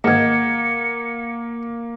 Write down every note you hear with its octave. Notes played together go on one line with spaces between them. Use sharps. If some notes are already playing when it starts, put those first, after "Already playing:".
G#2 D#3 A#3 F#5 G#6 C#7